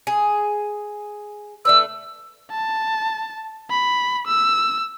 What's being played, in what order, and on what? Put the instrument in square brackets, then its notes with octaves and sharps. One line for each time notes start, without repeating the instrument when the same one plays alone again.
[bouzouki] G#4
[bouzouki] A3 D4 B4 [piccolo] E6
[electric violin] A5
B5
E6